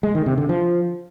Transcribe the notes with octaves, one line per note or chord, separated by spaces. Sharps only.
G#3
D#3
C3
D3
F3